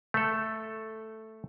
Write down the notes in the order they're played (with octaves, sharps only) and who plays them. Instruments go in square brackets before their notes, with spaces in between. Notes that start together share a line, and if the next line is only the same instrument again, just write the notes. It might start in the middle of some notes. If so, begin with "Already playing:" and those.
[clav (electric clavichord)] A3 A4